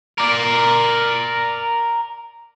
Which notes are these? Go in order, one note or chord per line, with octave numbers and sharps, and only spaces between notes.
A#4 D5